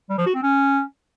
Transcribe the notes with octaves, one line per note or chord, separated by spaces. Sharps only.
G3
F3
F#4
C4
C#4